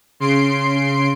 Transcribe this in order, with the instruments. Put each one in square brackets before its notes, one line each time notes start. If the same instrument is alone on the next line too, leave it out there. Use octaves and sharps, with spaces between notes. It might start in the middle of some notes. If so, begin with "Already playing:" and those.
[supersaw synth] C#3 C6 C7 D7